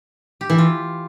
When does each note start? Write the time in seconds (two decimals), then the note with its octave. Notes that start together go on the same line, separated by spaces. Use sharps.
0.41 G4
0.50 E3
0.58 F4